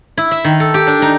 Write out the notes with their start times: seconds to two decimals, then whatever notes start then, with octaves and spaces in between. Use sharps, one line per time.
0.18 E4
0.31 E5
0.44 D#3
0.60 A4
0.74 G4
0.87 D4
1.02 D#4